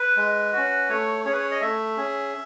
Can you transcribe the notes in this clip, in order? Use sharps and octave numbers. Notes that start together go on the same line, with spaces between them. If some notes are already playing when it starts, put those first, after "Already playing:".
Already playing: B4
G#3
C#4 F#4
A3 C#5
C#4 G#4 C#5
B4
C#5
D#5
A3 E5
C#4 G#4